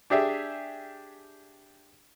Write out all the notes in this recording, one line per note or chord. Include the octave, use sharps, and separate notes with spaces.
D4 G4 G#4 E5